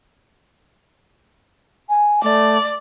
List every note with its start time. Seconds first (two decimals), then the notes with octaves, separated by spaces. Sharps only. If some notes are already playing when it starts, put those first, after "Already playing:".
1.89 G#5
2.23 A3 D5